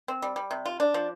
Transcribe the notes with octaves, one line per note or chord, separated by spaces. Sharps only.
C4
G3
G3
C3
F4
D4
F3